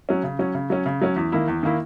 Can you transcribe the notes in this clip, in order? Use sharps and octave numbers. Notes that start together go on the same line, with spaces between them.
F#3 C#4
C#3
F#3 C#4
C#3
F#3 C#4
C#3
F#3 C#4
E2
D#3 A#3 E4
E2
D#3 A#3 E4